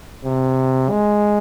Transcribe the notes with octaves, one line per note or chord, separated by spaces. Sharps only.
C3
G#3